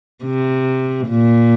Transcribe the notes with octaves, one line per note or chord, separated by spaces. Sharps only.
C3
A#2